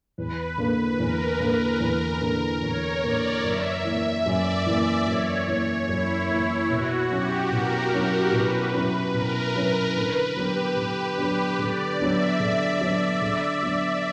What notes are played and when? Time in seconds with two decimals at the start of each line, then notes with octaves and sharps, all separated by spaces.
0.18 E2 B4
0.58 D3 A#3
0.99 E2 A#4
1.40 D3 A#3
1.80 E2
2.21 D3 A#3
2.62 E2 C#5
3.03 D3 A#3 D5
3.43 F#2 E5
3.85 E3 A#3
4.25 F#2 D5
4.66 E3 A#3
5.07 F#2 C#5
5.48 E3 A#3
5.89 F#2 E4
6.29 E3 A#3
6.70 B2 F#4
7.10 F#3 C#4 E4 G4
7.51 B2 A#4
7.93 F#3 C#4 E4
8.32 B2 B4
8.74 F#3 C#4 E4
9.14 B2 A#4
9.55 F#3 C#4 E4
9.96 D3 B4
10.36 F#3 B3 D4 G4
10.77 D3
11.18 F#3 B3 D4 G4
11.59 D3 D5
12.00 F#3 B3 D4 E5
12.40 D3 E5
12.81 F#3 B3 D4
13.22 D3
13.62 F#3 B3 D4